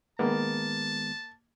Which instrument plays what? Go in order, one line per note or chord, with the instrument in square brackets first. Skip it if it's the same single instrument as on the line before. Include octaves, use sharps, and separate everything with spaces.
[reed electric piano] D#3 G#3 B3 [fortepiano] A#3 [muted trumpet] A5